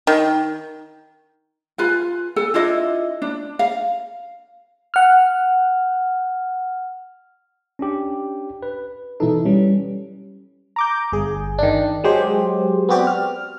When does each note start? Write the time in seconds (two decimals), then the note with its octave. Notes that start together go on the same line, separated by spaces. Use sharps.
0.07 D#3
1.78 F4 B4 G#5
2.36 A4 G#5
2.54 D4 E4 F4 D#5
3.22 D4
3.59 F5
4.94 F#5 F6
7.79 C#4 D4 G4
8.63 B4
9.20 B2 E3 D#4 E4 A4
9.45 G3 C#4 B4
10.76 A#5 D6 G6
11.12 G1 G#4
11.58 D#3 D4
12.04 F#3 G#3 G4 C5
12.89 B3 C4 F#4 G4 D5
13.07 F6